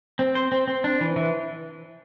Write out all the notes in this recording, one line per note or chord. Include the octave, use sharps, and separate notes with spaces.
C4
C5
C4
C4
D4
E3
E3